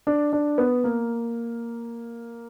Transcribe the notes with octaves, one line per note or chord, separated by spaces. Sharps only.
D4
D4
B3
A#3